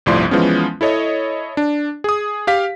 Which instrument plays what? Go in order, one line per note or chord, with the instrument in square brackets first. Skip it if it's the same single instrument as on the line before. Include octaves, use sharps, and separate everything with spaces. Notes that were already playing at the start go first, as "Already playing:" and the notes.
[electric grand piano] G1 C2 A2 F3 D5 C6
E3 F3 G#3 B3 C#4
E4 A4 C#5 D#5
D4
G#4 D#6
G4 F5 B6